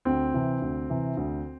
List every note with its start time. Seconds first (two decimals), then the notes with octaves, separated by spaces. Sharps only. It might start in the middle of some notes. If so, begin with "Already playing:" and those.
0.05 D2 C4
0.34 C3 E3
0.62 D2
0.90 C3 E3
1.17 D2